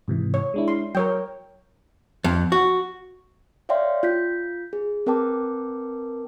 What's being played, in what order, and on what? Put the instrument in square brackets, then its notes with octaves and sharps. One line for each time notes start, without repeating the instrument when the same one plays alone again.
[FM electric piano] G#2 C3 E3
[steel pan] C#5
[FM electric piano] G#3 D4 E4
[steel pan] C6
[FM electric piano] F#3 [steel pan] A#4 C#5 G5
[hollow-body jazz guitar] F2
F#4
[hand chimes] C#5 D5 E5 F5 G5 C6
F4 G6 B6
G#4
C4 A#4 B4 G5 A5 D6